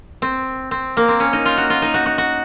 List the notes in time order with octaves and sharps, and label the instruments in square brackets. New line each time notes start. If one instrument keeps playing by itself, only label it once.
[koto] C4
C4
A#3
C4
C#4
D#4
F4
F#4
F4
D#4
F#4
F#4
F#4